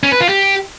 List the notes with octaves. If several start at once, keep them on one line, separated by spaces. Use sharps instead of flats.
C#4
B4
F4
G4